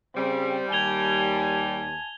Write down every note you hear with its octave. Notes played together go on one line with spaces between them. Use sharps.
C#3 G3 C4
D#2 G#5 A5 G#6 F7 G7